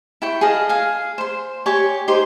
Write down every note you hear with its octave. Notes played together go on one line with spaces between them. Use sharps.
E4 G5 C#6
G#4 A4 D#5 F5
G#4 F5
C5 C6
G4 C#5 G#5 C#6
D#4 G4 C5 C6